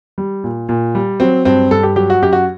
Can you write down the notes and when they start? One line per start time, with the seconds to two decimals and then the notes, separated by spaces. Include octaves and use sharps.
0.18 G3
0.44 A#2
0.69 A#2
0.95 G3
1.20 F#3 C4
1.45 G2 C4
1.71 G2 A4
1.83 G4
1.96 F#3 G4
2.10 F#4
2.22 F#2 G4
2.33 F#4